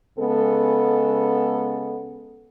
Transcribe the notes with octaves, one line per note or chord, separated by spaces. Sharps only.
C#3 G#3 B3 A4